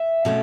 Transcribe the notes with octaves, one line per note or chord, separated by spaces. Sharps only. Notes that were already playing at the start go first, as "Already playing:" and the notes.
Already playing: E5
B2 A3 C#4